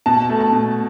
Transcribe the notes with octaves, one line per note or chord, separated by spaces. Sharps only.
B2 A5
A3
A5
B2